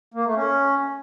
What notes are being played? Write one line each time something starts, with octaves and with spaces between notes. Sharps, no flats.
A#3
A3
C#4